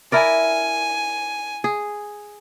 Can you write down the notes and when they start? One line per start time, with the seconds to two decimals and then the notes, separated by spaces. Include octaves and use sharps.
0.12 E4 A#4 D5 G#5
1.64 G#4